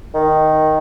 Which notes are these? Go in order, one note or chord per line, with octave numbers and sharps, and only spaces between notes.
D#3